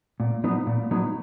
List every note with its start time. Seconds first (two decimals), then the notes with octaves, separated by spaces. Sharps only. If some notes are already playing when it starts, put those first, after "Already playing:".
0.20 A#2
0.44 F#3 B3 D#4
0.67 A#2
0.91 F#3 B3 D#4